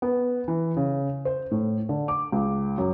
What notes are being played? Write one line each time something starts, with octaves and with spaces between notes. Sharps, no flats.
B3
E3
C#3
C5
A2
D3
D6
C#2
F#2